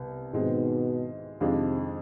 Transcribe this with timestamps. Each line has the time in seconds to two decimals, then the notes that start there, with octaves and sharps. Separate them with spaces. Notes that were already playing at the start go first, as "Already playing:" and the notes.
Already playing: C2 C3 B3
0.33 G#2 B2 D#3 G#3 C4
1.40 F2 C3 D#3 G#3 D4 F4